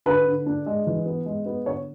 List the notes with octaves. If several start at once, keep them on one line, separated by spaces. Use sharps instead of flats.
D3 B4
D3
D4
G#3
E3
B3
G#3
B3
D3 C#5